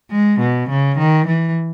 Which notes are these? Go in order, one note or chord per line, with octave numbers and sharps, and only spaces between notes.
G#3
B2
C#3
D#3
E3